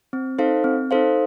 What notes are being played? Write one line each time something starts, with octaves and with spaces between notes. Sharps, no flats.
C4
D#4 A4 C5 F5
C4
D#4 A4 C5 F5